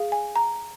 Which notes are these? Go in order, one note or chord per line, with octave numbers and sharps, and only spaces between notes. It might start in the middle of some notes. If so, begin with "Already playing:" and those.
Already playing: G#4 F5
G#5
A#5